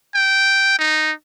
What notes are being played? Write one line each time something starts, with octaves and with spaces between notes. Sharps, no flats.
G5
D#4